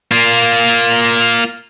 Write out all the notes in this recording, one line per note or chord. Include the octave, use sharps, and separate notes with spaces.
A#3 F4